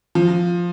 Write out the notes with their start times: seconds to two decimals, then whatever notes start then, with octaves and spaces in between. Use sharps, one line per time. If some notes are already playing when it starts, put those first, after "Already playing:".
0.15 F3